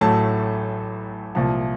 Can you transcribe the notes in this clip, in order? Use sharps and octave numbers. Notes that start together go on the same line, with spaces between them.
A1 A2 F#3 A3 A5
C2 A#2 F3 A5